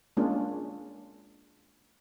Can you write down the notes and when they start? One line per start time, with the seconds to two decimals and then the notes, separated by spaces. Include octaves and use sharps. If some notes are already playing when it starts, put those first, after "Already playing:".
0.17 G#3 A#3 C#4 D4 F4